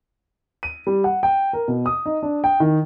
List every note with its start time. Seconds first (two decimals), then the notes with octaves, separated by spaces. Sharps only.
0.63 D#7
0.87 G3
1.04 F#5
1.23 G5
1.53 A#4
1.68 B2
1.86 D#6
2.06 D#4
2.23 D4
2.44 G5
2.60 D#3